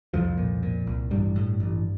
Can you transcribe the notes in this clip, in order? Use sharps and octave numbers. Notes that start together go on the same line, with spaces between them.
C2 F2 F3
A#2
A#2
C2
A1 G2 G3
A2
A1